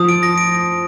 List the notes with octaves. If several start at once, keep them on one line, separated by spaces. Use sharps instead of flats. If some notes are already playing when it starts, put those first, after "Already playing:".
Already playing: F3 D#6
D7
A#6
D7